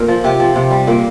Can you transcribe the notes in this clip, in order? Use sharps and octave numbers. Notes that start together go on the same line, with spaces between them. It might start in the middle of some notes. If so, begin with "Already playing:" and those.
Already playing: A#2 A#4
F3
C3 G4
F3
C3
G3
A#2 A#3